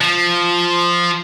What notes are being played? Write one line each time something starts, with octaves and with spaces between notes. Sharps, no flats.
F3